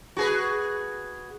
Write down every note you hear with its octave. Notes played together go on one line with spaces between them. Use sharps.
F#4 G#4 B4